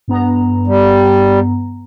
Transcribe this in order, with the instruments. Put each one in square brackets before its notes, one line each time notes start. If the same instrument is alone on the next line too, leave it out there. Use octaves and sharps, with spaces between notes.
[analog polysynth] G2 B3 A#5
[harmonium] G3